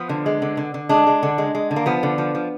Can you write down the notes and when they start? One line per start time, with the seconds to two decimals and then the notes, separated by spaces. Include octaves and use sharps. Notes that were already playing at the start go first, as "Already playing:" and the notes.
Already playing: F3 B3
0.09 D3
0.26 G#3
0.42 D3
0.57 D3
0.74 D3
0.89 G#3 D4
1.07 G#3
1.23 D3
1.38 G#3
1.55 G#3
1.71 D3
1.76 A#3
1.86 F3 B3
2.03 D3
2.18 F3
2.35 F3